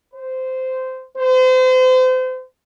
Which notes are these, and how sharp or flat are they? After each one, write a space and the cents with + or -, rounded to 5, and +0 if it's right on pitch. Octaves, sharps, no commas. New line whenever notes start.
C5 -15
C5 -35